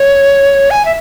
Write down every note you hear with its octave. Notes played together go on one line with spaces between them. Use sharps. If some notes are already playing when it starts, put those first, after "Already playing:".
Already playing: C#5
G#5
E5